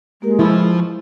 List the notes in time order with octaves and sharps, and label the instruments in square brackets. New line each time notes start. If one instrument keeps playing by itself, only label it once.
[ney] G#3 [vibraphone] A#3 G4 A#4
[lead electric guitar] F3 C5 [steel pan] E4 [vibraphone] C#6